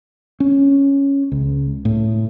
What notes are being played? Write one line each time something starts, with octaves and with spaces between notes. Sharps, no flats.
C#4
C#2
A2